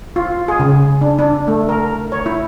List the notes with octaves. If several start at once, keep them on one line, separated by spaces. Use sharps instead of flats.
F4
G#4
C#3
D4
D4
A3
A#4
C#5
E4